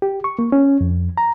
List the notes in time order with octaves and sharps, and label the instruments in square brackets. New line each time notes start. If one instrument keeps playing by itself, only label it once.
[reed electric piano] G4
C#6
A#3
C#4
F2
A#5